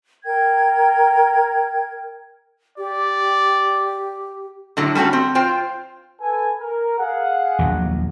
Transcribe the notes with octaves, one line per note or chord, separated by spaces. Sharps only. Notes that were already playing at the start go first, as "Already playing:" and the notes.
A#4 G5 G#6
G4 D5
A2 D3 F#3
G3 A3 C#4 F#4 A4
C4
F4 C5 G5
A4 B4 G#5
A#4
G#4 F5 F#5
A#1 D#2 F#3